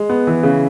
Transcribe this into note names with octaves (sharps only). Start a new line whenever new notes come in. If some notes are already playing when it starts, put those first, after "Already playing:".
Already playing: G#3
B3
E3
C#3